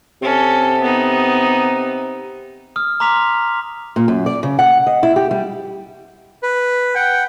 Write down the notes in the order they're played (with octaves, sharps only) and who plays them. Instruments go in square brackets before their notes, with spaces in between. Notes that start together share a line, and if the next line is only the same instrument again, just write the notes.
[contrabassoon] C3 [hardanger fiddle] C#4 A4
[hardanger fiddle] B3 D#4
[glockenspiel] D#6 F6
A#5 C6 D6 B6 F7
[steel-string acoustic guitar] A#2
F#2
D5
C#3
F#5
D#5
E4
G4
G3
[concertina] B4
[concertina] F#5 [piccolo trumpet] G5